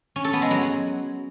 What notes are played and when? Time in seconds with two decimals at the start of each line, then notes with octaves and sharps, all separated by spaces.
0.16 C#4
0.24 A4
0.33 B3
0.42 G#3
0.51 F#3